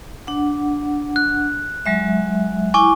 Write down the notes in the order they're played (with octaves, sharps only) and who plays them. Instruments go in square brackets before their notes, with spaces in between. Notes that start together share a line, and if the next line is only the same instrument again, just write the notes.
[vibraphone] D4 F#5
[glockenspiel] F#6
[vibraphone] F#3 G#3 E5
[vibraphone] E4 [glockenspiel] G#5 C#6 D6